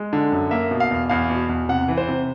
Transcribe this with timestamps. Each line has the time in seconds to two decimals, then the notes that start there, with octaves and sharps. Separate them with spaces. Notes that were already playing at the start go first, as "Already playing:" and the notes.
Already playing: G#3
0.13 D3
0.32 F#2
0.51 A#3 E5
0.71 B2
0.80 F5
0.91 E2
1.09 E2 F5
1.30 B2
1.49 E2
1.69 C3 F#5
1.88 E3
1.97 C5
2.08 C3